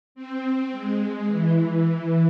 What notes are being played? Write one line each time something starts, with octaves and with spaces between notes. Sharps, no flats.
C4
G#3
E3